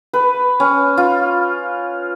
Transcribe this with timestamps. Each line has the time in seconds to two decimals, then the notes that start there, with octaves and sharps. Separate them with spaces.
0.13 B4
0.60 C#4
0.97 F4